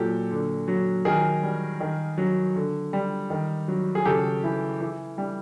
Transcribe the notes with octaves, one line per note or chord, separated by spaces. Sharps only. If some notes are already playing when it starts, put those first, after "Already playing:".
Already playing: A#2 F#3 G4 A4
D3
F#3
D#3 G#4 A#4
G3
D#3
F#3
D3
G3
D#3
F#3
G#4
C#3 G4 A4
E3
E3
G3